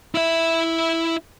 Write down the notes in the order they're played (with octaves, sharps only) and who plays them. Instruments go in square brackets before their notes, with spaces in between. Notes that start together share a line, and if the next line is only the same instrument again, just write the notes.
[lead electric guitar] E4 E5